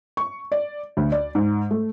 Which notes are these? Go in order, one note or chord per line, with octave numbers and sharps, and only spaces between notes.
C#6
D5
D2
D5
G#2
A3